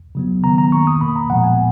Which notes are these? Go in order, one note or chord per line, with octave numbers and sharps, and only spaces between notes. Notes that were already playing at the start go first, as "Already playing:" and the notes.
C#3 F#3 B3
D#3 F#3 B3 A#5
A#5
D#3 A#3 C#6
D#6
B2 A#3 B5
A#5
A#2 F3 G#3 B3 F#5
G#5